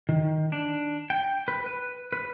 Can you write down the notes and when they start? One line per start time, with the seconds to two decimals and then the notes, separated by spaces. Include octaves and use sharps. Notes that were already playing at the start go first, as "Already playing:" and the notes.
0.09 D#3
0.52 D4
1.10 G5
1.48 B4
1.66 B4
2.12 B4